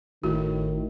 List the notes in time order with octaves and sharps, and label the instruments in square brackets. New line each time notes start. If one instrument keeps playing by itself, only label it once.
[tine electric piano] G#1 A3 [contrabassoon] A2 [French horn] D#3 [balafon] F#4